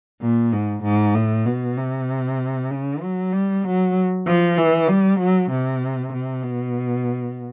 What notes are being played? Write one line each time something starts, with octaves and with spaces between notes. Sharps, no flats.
A#2
G#2
G#2
A2
B2
C3
C#3
F#3
G3
F#3
F3
E3
G3
F#3
C3
C3
B2